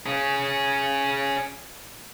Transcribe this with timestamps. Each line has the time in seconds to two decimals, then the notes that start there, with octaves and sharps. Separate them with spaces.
0.06 C#4 G#4